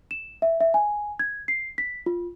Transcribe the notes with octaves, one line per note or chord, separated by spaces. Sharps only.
E7
E5
E5
G#5
G#6
C7
B6
F4